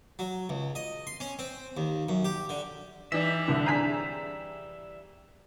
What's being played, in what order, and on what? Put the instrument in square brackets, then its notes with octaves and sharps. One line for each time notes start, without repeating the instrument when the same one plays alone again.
[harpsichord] F#3
C#2
D#5
C6
C#4
C4
D#2
F#2
G4
D3
[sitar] E3 G3 [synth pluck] D#4 E6 [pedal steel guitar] E5
[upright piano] C2 D3
[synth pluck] D4 G#4 C5 [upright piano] A#5 B6